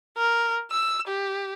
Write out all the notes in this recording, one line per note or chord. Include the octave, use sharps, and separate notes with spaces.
A#4
E6
G4